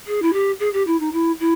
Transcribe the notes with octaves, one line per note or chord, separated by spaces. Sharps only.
G#4
E4
G4
G#4
G4
E4
D#4
E4
E4